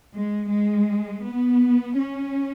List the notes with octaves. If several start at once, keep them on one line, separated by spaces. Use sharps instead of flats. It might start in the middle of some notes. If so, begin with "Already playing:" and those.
G#3
G#3
B3
C#4